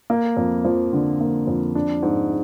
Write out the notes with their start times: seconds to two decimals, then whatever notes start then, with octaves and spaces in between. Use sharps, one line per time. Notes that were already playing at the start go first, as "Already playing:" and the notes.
0.10 A#3
0.37 F2
0.65 F3
0.93 D3
1.21 A#3
1.47 F2
1.75 D4
2.02 G#2